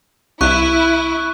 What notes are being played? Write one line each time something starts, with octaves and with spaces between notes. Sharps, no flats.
C2 E4 C#6 F#6